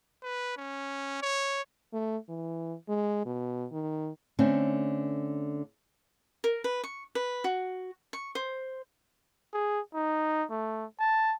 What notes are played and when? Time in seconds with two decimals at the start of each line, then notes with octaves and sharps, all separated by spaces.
0.23 B4
0.57 C#4
1.22 C#5
1.93 A3
2.29 E3
2.89 G#3
3.25 B2
3.72 D#3
4.39 D3 A3 C4 C#4
6.44 A#4
6.64 B4
6.84 C#6
7.15 B4
7.44 F#4
8.13 C#6
8.35 C5
9.53 G#4
9.94 D#4
10.51 A3
10.99 A5